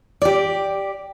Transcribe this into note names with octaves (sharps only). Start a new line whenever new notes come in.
G4 D5